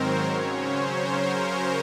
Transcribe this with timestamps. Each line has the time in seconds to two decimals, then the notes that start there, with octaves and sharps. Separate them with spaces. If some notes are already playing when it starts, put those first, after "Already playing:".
Already playing: G#2 D#3 F#3 C4 A#4 C5 C#5
0.24 C#3 F#3 C#4 C#5
0.61 C5
0.97 A#4